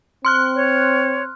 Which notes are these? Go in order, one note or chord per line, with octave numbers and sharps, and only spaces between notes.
C4 C6 F6 F#6
C#5